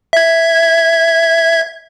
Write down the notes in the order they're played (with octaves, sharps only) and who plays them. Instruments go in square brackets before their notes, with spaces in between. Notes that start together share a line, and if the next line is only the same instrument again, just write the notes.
[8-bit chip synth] E5 G#6